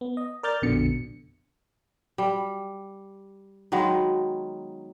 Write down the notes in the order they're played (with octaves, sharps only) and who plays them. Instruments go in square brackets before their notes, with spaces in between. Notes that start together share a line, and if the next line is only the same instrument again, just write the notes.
[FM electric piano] B3
D#5
A#4 D5 F6 G6 A6
A#1 F2 B2 D3 C#7
[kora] G3
D#3 F#3 G#3 B3